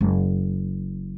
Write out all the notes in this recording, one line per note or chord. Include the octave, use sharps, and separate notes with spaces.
F#1